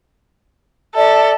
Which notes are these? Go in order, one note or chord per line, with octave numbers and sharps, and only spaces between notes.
A4 D5 E5